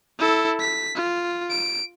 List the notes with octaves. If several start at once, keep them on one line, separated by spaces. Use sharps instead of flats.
E4 A4
B6
F4
D7